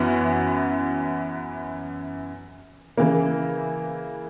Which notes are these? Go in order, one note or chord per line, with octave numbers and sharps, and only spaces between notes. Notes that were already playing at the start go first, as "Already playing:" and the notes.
Already playing: F#2 E3 B3 F#4
C#3 E3 A#3